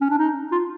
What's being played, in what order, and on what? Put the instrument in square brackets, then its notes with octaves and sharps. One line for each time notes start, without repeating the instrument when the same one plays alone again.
[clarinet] C#4
D4
D#4
F4